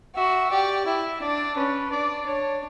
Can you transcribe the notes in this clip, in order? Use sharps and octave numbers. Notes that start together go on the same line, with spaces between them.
F#4 E5
G4 D5
E4 E5
D4 D5
C#4 B4
D4 D5
D4 C#5